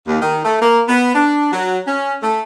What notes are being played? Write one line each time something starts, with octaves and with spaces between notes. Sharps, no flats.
D#2
D#3
A3
A#3
B3
D4
F#3
C#4
A3